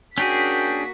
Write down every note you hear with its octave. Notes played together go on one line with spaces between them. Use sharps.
A#3 C#4 D4 F#4 G#4 G5 B6